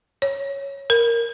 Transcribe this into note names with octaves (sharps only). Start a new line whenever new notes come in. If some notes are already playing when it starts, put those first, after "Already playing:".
C#5
A#4